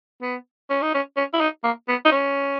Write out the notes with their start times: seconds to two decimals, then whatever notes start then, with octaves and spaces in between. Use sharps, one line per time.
0.22 B3
0.70 C#4
0.82 D#4
0.94 C#4
1.17 C#4
1.34 E4
1.41 D#4
1.64 A#3
1.88 B3
2.05 D#4
2.12 C#4